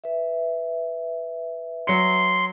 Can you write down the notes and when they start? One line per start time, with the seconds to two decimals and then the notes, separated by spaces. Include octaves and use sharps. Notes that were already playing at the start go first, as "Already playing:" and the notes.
0.04 B4 E5
1.87 F#3 C6 C#7